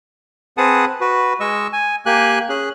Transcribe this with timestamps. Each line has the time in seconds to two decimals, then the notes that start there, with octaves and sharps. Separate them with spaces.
0.58 C4 G#4 B4 F#5 A5 D#6
1.01 F#4 B4
1.40 G#3 D#5 C#6 E6
1.73 G#5
2.06 A#3 G4 G#5 F#6
2.49 C#4 G#4 F#6